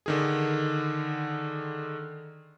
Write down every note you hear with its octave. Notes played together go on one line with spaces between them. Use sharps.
D3 D#3 G#4